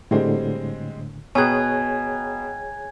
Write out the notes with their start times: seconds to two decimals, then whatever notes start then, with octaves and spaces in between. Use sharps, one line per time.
0.11 A2 D3 G3 G#3 C4
1.35 B2 G#4 C#5 G5 G#5 A#5 F#6 G#6